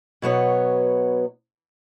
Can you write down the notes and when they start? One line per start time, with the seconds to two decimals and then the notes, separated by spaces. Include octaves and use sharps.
0.22 B2 F#3 B3 C#5